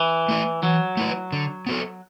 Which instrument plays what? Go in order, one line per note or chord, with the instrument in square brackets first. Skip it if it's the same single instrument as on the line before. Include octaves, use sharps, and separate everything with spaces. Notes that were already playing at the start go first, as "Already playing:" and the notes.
Already playing: [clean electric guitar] E3
[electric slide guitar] A3 E4 B4
[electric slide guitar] E3 [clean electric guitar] F#3
[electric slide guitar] A3 E4 B4
D3
B3 F#4 A4